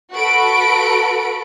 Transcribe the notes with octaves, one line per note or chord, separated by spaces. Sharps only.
F#4 A4 B4 B5 D7